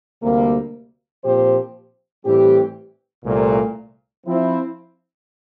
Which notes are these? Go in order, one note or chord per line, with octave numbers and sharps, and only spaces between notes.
D2 C3 G3 A#3
A#2 F3 C4 G4 C5
A2 E3 G3 C4 G4
C2 A#2 A3
F3 C4 E4